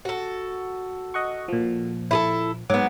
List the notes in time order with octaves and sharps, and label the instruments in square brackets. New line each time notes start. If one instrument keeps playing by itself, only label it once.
[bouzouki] F#4 A4
[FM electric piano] D#5 F#5 C#6
A#2 F3
[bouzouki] E4 G#4 A4
[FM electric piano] G#2 D6 [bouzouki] F#3 B3